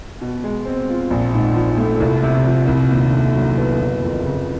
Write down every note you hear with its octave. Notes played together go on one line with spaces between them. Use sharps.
B2
G#3
C4
F4
A#1
G#2
F3
A3
C2
C3
F3
C2
D#2
D3
F#3
B3
F#1
F2
C#3